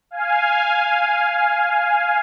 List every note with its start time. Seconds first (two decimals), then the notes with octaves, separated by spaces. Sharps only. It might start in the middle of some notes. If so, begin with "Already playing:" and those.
0.11 F5 G#5